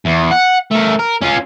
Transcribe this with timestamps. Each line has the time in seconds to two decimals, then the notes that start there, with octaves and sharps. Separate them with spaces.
0.06 E2
0.32 F#5
0.71 A3 A#4
1.00 A#4
1.22 C#4 F4